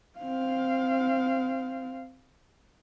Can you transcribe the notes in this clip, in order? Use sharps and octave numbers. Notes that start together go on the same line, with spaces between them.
C4 F5